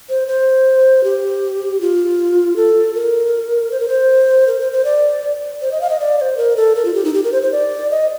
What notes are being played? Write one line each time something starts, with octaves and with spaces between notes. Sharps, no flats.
C5
C5
G4
F4
A4
A#4
C5
A#4
C5
A#4
C5
C5
D5
C5
D#5
F5
D#5
D5
D5
C5
A#4
A4
A#4
F4
G4
D#4
G4
A#4
C5
C5
D5
D#5